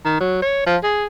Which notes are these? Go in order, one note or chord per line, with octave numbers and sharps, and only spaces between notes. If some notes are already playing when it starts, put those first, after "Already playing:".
D#3
F#3
C#5
F3
G#4